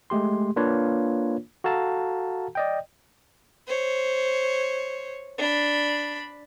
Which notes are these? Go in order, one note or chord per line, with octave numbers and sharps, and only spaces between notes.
G#3 A3 G4 C6
A#3 D4 F4 B4 C#5
F#4 A4 F5 A5 A#5
D5 D#5 G5
C5 C#5
D4 B5